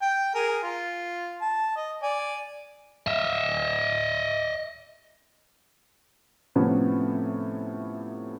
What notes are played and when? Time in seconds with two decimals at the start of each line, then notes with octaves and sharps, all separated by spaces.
0.02 G5
0.35 G#4 A#4 G#5
0.63 F4
1.42 A5
1.77 D#5
2.03 D5 G#5
3.07 D#5 E5
6.56 A2 C3 F3 B3 C#4